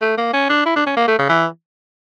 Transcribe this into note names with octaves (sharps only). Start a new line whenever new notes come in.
A3
A#3
C#4
D4
E4
D4
C#4
A#3
A3
C#3
E3